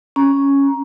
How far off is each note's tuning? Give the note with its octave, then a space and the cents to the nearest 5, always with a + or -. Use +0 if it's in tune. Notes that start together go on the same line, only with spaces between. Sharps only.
C#4 +0 A#5 +15